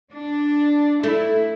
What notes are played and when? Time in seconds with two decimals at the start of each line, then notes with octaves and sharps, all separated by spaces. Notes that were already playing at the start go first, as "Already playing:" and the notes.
0.12 D4
1.03 A3 E4